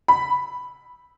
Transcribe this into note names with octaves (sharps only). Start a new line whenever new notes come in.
B5